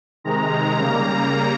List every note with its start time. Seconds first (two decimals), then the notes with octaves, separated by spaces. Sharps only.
0.24 C3 D#3 G#3 A#5
0.76 C#3 G3 A#3 A#5